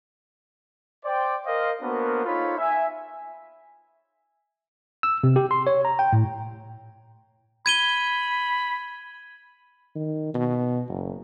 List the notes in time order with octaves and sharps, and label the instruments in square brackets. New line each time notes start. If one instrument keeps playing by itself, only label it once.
[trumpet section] C5 D5 G5
A#4 C5 D#5 F5
A#3 B3 D4 F#4 A#4 C5
D#4 F4 A4 C5 C#5 B5
E5 G#5
[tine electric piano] E6
C3
G4
C6
C#5
A#5
G5
A2
[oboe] B5 [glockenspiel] G#6 D#7 G7
[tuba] D#3
B2
F#1